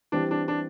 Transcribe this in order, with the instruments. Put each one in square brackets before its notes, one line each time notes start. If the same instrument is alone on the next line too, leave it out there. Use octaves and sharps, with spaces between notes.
[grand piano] E3 G3 C4 G4 [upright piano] D4
[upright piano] D4
D4